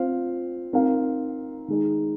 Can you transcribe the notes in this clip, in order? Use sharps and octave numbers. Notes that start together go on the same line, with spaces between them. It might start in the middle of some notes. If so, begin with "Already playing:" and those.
Already playing: C4 F4 C5 F5
C4 D#4 A#4 F5
D#3 G#3 D#4